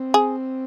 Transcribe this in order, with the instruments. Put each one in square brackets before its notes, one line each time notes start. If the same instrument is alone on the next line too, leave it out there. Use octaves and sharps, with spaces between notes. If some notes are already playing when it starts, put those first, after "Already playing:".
Already playing: [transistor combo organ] C4
[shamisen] G#4